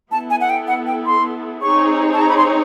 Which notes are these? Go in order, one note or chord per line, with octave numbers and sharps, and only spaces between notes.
B3 E4 A4 A5
G#5
F#5
G5
F#5
G5
C6
C4 D#4 G#4 C#5 C#6
A5
A#5
B5
C6